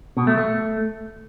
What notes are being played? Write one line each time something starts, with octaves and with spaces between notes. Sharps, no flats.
B2
A3
A3